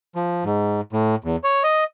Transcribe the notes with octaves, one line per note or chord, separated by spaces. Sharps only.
F3
G#2
A2
E2
C#5
D#5